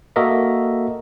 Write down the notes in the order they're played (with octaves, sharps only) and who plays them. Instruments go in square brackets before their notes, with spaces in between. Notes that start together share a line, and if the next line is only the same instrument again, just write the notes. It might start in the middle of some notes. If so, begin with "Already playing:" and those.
[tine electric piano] A#3 F#4 A4 A#4 D#5 E5